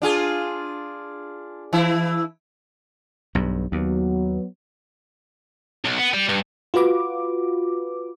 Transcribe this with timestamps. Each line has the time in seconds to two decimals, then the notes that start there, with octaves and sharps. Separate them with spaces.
0.02 D4 F4 G#4
1.73 E3 E4
3.35 B1 G2
3.72 D#2 F#3 B3
5.85 B1
5.98 B3
6.14 G3
6.29 G2
6.74 F4 F#4 B4 D6